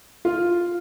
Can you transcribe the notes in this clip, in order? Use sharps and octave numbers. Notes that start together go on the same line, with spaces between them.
F4